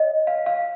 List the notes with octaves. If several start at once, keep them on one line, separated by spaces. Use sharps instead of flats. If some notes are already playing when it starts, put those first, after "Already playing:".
Already playing: C#5 D#5
F5
F5